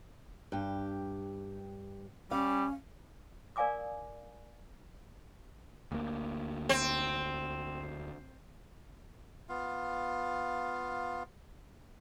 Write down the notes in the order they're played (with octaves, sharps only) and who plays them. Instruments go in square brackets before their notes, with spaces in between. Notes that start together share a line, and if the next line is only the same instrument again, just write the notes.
[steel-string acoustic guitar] G2 G4
[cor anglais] G3 [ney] C#4 [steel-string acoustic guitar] F5
[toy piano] A#4 D5 F5 G#5 D6 D#6
[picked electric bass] D2 A#3
[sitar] C4
[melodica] B3 F4 F5